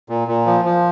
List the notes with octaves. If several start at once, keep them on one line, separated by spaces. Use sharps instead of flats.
A#2
A#2
F3
F3